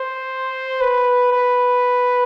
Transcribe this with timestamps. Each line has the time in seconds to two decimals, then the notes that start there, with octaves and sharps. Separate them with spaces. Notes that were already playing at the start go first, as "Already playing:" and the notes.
Already playing: C5
0.81 B4
1.33 B4